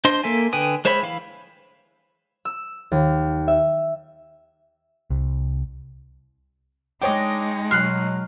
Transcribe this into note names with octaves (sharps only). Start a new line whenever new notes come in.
D4 C5 D#5 C6
A#3 A4 E5 G#5
D3 B4 G5 G#5 D#6
G#3 C5 C#5 E5 B5
E3 F5 B5
E6
D#2
E5
C2
G#3 D4 D#4 C#5 D#5 G5
B2 F#3 C6 F6 F#6